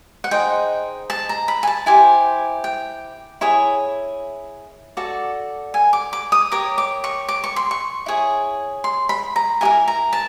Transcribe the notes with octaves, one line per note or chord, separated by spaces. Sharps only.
F#5
D#4 G#4 C5 D#5 G5
A5
A#5
B5
G#5
A5
E4 G4 C5 G#5
G5
E4 G#4 C#5
F#4 A4 D5
G#5
D6
D6
D#6
G4 A#4 C#5 D6
D6
C#6
D6
C#6
C6
C#6
E4 G#4 C#5
C6
B5
A#5
E4 G4 A#4 G#5
A#5
A5